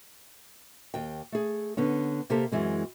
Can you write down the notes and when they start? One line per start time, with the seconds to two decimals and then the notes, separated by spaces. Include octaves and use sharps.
0.94 D#2 G5
1.32 A3 G#4
1.77 D3 B3 C#4
2.30 C3 A#3 G4 A4 A#4 C5
2.52 F#2 E3 G#3 C4